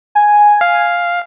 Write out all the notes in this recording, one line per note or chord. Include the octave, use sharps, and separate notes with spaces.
G#5
F5